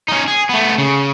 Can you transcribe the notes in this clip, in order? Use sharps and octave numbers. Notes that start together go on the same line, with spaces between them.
C#4 D#4
G#4
A3 B3
C#3